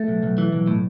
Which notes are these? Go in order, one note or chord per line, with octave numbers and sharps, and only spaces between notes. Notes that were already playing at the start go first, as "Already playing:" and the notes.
Already playing: A3
B1
B1
E3
B1
A2